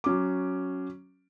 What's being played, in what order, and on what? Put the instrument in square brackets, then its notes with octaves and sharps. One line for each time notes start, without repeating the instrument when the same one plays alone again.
[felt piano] F#3 C#4 D6